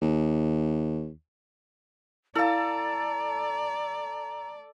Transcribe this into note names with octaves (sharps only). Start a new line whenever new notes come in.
D#2
E4 A4 D5 F5 A5 A#5